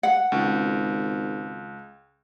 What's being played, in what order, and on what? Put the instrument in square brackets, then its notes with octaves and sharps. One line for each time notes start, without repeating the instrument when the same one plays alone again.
[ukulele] F#5
[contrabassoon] G#1 [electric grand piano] C#2